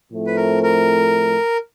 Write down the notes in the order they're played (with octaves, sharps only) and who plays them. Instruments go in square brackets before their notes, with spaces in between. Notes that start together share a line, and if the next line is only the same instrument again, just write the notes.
[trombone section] A2 F3 A3 C4
[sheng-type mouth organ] B4
A#4
A#4